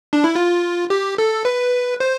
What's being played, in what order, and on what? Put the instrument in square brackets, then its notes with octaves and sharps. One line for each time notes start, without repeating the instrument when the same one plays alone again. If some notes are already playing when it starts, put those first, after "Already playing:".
[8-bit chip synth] D4
E4
F4
G4
A4
B4
C5